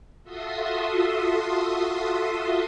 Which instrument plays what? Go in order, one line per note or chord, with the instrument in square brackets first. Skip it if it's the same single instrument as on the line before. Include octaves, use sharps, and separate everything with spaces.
[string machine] F4 F#4 A4 E5 C6 D#6